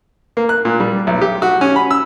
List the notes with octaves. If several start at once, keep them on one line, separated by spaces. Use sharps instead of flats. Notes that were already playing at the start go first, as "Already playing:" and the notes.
A#3
F#6
A#2
G3
B1
G4
F#4
C#4
B5
E6